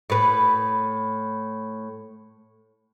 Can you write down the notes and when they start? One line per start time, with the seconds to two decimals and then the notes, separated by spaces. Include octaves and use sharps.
0.10 A2 B4